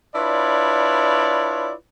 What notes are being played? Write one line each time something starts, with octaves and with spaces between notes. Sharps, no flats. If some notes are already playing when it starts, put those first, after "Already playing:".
D4 E4 F4 B4 C#5 D5